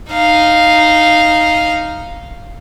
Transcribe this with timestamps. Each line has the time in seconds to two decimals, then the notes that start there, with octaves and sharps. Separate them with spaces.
0.10 D#4 F5